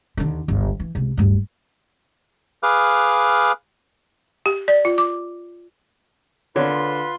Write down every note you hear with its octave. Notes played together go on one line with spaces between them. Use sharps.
D#2 D3
G1 C#2
E3
C#2 C3
D1 G2
G#4 B4 F5 D6 F6 F#6
G4
D5
F4
D6
D3 F4 A#4 B4 C#5 C6